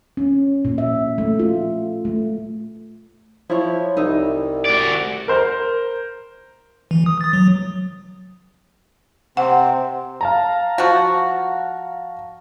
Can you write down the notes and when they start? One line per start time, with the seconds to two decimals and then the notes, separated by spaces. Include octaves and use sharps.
0.17 C#4
0.65 A#2
0.78 E5
1.18 A3
1.39 F4
2.05 A3
3.50 F3 E4 C#5
3.97 C2 D#4 E5
4.65 F#4 D5
5.28 A#4 C5
6.91 E3
7.06 D#6
7.21 D#6 A6
7.33 F#3
9.37 C3 C4 F#5
10.21 F5 A5 A#5
10.78 F3 F#4